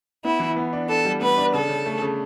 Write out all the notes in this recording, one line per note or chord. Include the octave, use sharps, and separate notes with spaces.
B3 E4
E3
B3
D4
D4 A4
G3
B3 B4
D4
C#3 A4
C#3
A3
C#3